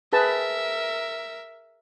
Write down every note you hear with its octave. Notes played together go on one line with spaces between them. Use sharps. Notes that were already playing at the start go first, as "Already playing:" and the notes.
G#4 A#4 B4 E5 A5